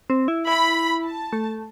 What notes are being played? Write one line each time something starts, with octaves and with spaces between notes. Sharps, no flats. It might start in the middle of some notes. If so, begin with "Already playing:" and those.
C4
E4
E4 B5
A5
A3